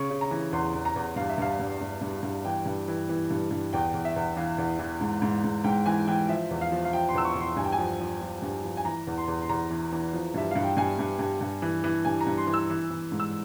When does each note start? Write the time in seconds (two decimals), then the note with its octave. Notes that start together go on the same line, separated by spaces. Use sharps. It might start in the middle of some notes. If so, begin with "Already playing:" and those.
Already playing: C#3 C#6
0.10 C#3
0.21 A#5
0.31 E3
0.52 E2 C6
0.74 E2
0.85 A#5
0.96 E2
1.16 G2 F5
1.29 E5
1.38 G2 F5
1.60 G2
1.81 G2
2.02 G2
2.23 G2
2.44 E3 G5
2.66 G2
2.88 E3
3.09 E3
3.31 G2
3.51 G2
3.73 E2 G5
3.94 E2
4.05 E5
4.16 E2
4.37 E3 F5
4.58 E2
4.79 E3
5.01 G#2
5.22 G#2
5.44 G#2
5.64 G#2 G5
5.86 E3 G#5
6.07 E3 G5
6.29 F3 E5
6.50 E2
6.61 F5
6.72 F3
6.85 F5
6.93 F3 G5
7.09 C6
7.15 E2 E6
7.25 C#6
7.35 E2
7.40 C6
7.57 G2 G#5
7.64 G5
7.72 G#5
7.79 F3
8.00 F3
8.21 F3
8.42 G2
8.64 F3
8.77 G#5
8.85 E3 A#5
9.07 E2
9.18 C6
9.28 E2
9.42 C6
9.49 E2 A#5
9.70 E3
9.92 E3
10.13 F3
10.34 G2 E5
10.51 G2 F5
10.63 G5
10.77 G2 G#5
10.99 G2
11.19 G2
11.41 G2
11.62 E3
11.84 E3
12.05 G2 G#5
12.21 A#5
12.27 G2
12.38 C6
12.47 E3
12.54 E6
12.70 E3
12.90 E3
13.12 G#2
13.20 E6